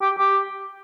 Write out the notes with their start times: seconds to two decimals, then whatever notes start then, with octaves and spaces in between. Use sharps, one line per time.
0.01 G4
0.18 G4